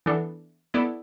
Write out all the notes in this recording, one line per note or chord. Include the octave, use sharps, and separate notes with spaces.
E3 B3 D4 A4
B3 E4 A4 D5